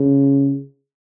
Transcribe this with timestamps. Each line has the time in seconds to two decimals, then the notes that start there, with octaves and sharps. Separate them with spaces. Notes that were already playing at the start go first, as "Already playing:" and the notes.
Already playing: C#3